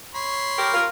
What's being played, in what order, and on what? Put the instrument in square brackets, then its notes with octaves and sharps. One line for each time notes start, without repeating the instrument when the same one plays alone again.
[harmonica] C#5 B5 C6
[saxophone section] G4 A#4
F4 A#4